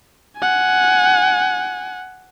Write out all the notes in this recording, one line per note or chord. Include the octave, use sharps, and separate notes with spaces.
F#5 G#5